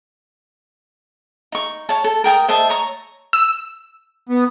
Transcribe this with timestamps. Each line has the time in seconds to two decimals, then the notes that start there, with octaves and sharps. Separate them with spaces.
1.52 D#4 C#6
1.89 C#5 A5
2.04 A4
2.24 A#4 G5 A5 D#6
2.48 C5 D#5 E5 A5
2.69 C#5 A#5 C#6
3.33 E6
4.29 B3